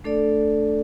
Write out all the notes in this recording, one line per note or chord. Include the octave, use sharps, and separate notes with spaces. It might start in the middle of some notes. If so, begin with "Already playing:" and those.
A3 D4 A4 D5